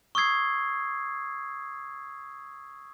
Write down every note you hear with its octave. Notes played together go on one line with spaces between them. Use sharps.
C#6 D#6 E6 G#6 C7